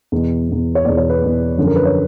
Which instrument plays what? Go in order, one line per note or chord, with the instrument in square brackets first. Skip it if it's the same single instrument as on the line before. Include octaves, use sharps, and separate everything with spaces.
[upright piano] E2 B2
E2 B2
C#5
E2 B2 D5
C#5
B4
E2 B2
F#2 D3 F3
A#4
B4
C#5